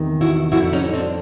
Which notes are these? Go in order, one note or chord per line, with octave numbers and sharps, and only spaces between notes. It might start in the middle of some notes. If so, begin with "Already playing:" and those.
Already playing: E2 C3 D#3
E4 F#4
F2 D3 E4 F#4
C#4 D#4
C4 D4